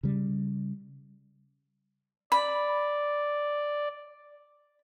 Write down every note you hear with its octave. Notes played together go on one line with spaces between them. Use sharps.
C#3 G3
D5 B5